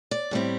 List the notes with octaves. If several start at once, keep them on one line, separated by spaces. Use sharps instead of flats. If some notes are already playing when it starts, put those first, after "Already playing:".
D5
A2 G3 C4 E4